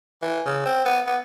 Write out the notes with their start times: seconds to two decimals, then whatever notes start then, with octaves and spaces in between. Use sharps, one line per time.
0.22 E3
0.46 C#3
0.66 C4
0.85 B3
1.07 B3